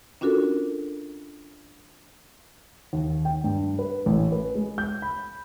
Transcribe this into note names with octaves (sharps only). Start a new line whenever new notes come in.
C#4 D4 F4 F#4 A4 A#4
D#2
G5
G2
B4
A1
B4
G#3
G6
B5